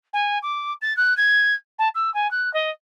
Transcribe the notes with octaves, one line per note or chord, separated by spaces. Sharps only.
G#5
D6
A6
F#6
G#6
A5
E6
G#5
F#6
D#5